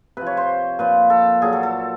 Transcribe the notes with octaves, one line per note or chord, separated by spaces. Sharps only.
C3 F3 B4
C#5
C5
A#2 F3 B4
A4
A#2 F#3 G#4
A4
A4